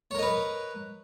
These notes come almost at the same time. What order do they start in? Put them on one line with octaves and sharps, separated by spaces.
C#5 A#4 D#5 B4